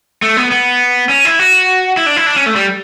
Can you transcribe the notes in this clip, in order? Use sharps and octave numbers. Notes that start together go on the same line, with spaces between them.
A3
B3
B3
C#4
E4
F#4
E4
D4
E4
D4
C#4
A3
G3